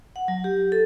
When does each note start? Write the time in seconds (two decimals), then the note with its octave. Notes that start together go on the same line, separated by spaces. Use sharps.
0.16 F#5
0.28 F#3
0.44 G4
0.72 A4